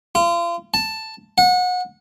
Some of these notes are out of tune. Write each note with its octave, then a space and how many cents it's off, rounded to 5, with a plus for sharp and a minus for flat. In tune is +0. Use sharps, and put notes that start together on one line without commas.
F4 -35
A5 +5
F#5 -30